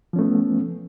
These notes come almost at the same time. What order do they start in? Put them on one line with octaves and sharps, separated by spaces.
F3 C#4 A3 B3